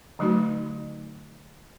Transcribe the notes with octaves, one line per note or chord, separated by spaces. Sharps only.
D3 F#3 A3 D#4 F#4